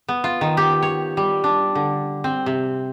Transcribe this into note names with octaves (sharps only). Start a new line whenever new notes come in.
B3
F4
D#3
G4
C#5
G3
D4
D3
C4
C3